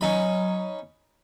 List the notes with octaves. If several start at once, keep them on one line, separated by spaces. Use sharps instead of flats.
F#3 C#4 D#4 B5